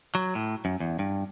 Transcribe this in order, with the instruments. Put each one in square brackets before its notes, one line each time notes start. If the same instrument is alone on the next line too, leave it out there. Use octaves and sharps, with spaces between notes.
[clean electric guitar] F#3
A2
F#2
E2
G2